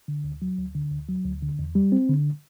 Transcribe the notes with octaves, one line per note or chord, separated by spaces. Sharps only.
D3
D2
F#3
D2
D3
D2
F#3
D2
D3
E2
G3
C4
D3